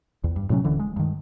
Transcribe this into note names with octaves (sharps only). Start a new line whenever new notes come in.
E2
G2
A2 C3 F#3 C#4
D#1 D3 E3
G#3
G2 D#3